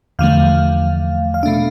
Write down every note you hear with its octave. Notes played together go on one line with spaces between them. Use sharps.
E2 D3 F3 A3 F5
F5
B2 A3 D4 E5